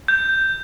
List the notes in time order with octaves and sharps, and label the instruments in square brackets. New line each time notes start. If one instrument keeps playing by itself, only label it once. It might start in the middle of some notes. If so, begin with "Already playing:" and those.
[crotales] G6